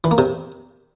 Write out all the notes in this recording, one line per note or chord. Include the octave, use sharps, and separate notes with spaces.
E3
A#3
C3